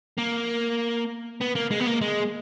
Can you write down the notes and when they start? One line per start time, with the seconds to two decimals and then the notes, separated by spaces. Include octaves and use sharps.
0.18 A#3
1.41 B3
1.56 A#3
1.71 G#3
1.80 B3
1.87 A#3
2.01 G#3